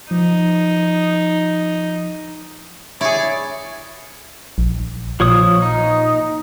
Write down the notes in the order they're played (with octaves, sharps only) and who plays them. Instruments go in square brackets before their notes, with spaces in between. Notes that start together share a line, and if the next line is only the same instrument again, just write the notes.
[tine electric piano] F3 [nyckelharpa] D#4
[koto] E4 G#4 [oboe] C#5 [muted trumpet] D5
[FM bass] A#1
[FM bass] A#2 [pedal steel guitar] F3 C#5 D#6
[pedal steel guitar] D#4